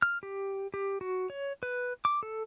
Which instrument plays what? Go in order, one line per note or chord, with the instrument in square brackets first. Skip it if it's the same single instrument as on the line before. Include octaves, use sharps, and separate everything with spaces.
[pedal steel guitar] F6
G4
G4
F#4
C#5
B4
D6
A4